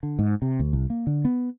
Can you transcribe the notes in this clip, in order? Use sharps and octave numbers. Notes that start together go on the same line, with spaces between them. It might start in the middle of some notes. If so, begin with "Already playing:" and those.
D3
G#2
C3
D2
C2
A#3
D3
B3